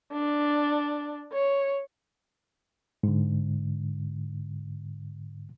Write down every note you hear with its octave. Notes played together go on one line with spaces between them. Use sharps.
D4
C#5
G#2 D3